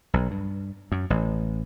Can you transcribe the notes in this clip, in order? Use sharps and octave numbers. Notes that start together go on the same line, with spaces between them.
B1
G2
F#2
A1